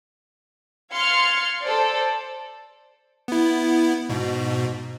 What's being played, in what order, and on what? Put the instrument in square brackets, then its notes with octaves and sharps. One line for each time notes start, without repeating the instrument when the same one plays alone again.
[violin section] F5 C6 F6 G#6 A6 C#7
A4 C5 D5
[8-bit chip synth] B3 E4
G#2 B2